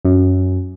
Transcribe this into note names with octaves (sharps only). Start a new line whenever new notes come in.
F#2